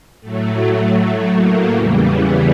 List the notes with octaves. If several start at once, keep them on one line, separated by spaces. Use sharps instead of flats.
A2 F#3 A3
A#3
E2 C#3 E3 G3
B3